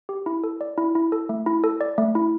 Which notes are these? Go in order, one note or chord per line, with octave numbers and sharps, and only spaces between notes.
G4
E4
A4
D5
E4
E4
A4
A3
E4
A4
D5
A3
E4